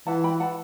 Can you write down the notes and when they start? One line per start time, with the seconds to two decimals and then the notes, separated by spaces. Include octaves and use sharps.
0.07 E3 F#5 A5
0.24 G5 B5
0.40 F#5 A5